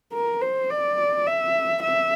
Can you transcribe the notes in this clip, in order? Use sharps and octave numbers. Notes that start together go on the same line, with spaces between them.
A#4
C5
D5
E5
E5